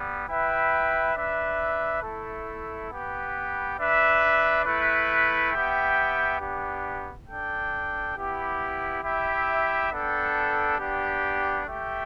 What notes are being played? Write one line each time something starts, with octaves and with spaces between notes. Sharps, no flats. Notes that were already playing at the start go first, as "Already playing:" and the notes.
Already playing: G3 B3
E4 B4 E5 G5
D4 B4 E5
A3 E4 A4
B3 G4 B4
D4 B4 E5
A3 E4 B4
B3 G4 E5 G5
B3 D4 G4
D4 A4 G5
B3 E4 G4
E4 G4 E5
B3 D4 A4 G5
B3 D4 G4
A3 G4 E5 G5